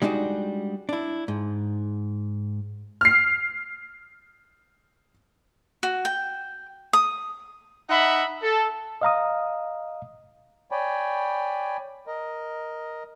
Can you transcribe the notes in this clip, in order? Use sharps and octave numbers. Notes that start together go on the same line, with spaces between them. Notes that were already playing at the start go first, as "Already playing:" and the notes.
G3 G#3 D4 D#4 F#4
D4 E4
G#2
F6 C7
F#4
G5
D#6
D#4 E5 F#5 B5
A4
D#5 F5 A#5 D#6
C#5 D5 G5 G#5 B5
A#4 D#5